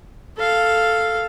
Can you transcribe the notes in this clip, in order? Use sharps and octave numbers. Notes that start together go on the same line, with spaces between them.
A4 F5